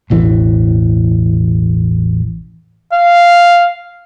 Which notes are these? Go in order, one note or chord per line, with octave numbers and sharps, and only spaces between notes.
E1 A1 E3
F5